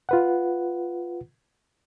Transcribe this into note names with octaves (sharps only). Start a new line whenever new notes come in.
F4 B4 F#5